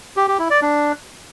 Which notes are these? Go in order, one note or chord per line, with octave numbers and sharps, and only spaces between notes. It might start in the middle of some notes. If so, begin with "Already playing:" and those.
G4
G4
E4
D5
D4